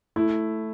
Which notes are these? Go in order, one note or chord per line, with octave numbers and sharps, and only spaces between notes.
A3 E4